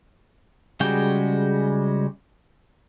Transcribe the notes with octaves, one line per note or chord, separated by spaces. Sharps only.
C#3 G3 G#3 F#4 G5